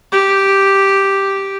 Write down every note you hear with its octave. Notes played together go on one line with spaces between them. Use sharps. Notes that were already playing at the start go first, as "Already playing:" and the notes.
G4